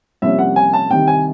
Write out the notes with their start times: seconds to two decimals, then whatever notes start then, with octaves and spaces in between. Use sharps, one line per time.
0.22 C2 C3 F3 A#3 C#4 E5
0.39 F#5
0.56 G#5
0.73 A5
0.90 C2 C3 D#3 G5
1.07 G#5